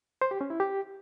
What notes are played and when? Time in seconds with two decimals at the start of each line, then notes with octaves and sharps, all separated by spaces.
0.22 C5
0.31 G4
0.41 C#4
0.50 E4
0.60 G4